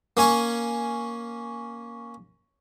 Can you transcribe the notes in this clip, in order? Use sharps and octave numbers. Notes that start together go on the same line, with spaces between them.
A#3 C#4 G#5 C#6